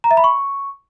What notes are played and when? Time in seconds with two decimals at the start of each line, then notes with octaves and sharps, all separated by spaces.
0.04 A#5
0.11 E5
0.17 B5
0.24 C#6